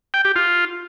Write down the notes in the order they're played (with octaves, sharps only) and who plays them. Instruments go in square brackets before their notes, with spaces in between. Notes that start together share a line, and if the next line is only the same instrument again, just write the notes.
[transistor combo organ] G5
G4
F4